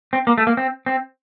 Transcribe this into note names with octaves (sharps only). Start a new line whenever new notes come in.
C4
A#3
A3
A#3
C4
C4